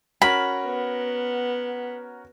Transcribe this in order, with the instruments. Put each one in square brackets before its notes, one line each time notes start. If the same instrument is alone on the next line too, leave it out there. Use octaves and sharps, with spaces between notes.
[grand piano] C#4 F#4 A#4 [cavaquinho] B5
[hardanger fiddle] B3